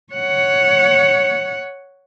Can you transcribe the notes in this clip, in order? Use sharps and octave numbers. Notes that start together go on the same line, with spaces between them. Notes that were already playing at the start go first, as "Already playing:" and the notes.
C#5 F#5